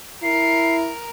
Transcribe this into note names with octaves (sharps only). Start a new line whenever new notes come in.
E4 A#4 C7